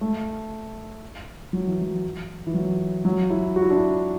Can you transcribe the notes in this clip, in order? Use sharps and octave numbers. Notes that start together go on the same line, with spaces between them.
A3
F#3
E3
F#3
E3
F#3
F#3
E4
F#4
E4
D4
E4